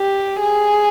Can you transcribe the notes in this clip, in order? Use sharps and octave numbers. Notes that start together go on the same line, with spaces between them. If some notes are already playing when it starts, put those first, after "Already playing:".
Already playing: G4
G#4